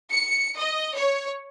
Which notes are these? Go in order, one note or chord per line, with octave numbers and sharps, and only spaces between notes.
C#7
D#5
C#5